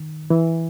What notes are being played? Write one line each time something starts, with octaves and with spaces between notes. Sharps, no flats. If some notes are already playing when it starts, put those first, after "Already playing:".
Already playing: D#3
E3